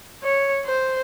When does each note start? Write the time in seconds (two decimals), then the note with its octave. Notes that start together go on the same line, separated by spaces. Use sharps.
0.23 C#5
0.66 C5